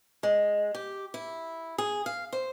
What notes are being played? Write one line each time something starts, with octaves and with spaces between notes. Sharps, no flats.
G#3
G4
E4
G#4
F5
C5